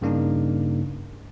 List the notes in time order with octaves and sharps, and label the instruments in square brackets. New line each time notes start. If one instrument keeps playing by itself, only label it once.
[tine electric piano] G2 C#3 A#3 D4 D#4